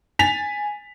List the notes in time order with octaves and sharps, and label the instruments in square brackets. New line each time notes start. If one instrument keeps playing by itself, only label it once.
[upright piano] G#5 A6 B6 F7